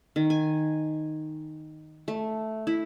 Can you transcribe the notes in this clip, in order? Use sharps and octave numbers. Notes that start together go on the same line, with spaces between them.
D#3
G#5
A3
E4